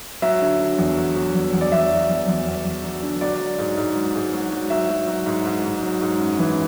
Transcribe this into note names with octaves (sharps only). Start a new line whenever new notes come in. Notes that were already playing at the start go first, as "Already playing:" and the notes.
F#3 E5
D3
D3
E2
F#3
F#3
E2
E2
D5
E2 E5
F#3
E2
E2
E2
E2
F#3
D3
F#3 D5
F#3
G#2
G#2
F#3
G#2
F#3
F#3
F#3 E5
F#3
F#3
G#2
G#2
G#2
F#3
G#2
F#2
E3